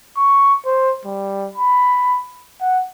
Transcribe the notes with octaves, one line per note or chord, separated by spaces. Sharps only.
C#6
C5
G3
B5
F#5